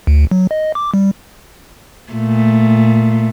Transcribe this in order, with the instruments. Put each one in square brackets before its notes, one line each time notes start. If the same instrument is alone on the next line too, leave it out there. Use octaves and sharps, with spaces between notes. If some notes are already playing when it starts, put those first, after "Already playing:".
[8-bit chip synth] D2
F#3
D#5
D6
G3
[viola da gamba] A#2 A3